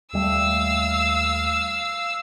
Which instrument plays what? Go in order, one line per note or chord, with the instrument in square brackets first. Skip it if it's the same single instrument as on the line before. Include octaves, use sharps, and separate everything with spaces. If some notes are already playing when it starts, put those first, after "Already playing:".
[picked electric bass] D#2 G3 A3 [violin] F5 E6